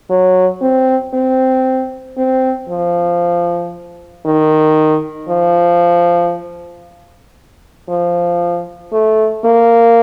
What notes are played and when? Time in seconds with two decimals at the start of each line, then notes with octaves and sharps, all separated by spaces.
0.10 F#3
0.61 C4
1.13 C4
2.17 C4
2.69 F3
4.25 D#3
5.29 F3
7.89 F3
8.92 A3
9.45 A#3